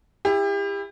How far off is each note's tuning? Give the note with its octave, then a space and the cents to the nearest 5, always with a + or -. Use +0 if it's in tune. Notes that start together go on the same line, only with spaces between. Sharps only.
E4 +5 G4 +35